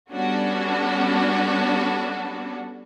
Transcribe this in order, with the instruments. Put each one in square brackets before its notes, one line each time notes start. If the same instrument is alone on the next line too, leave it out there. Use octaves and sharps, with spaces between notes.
[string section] G3 B3 C#4 D4 F#4 A4